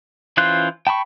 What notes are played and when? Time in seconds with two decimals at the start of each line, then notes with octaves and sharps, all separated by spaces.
0.37 E3 C#4 F4 C5 F#6
0.87 G5 A5 B5 C#6